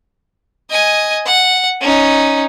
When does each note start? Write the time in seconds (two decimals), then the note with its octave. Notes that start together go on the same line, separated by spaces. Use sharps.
0.71 D#5 G#5
1.27 F#5
1.82 C#4 D#4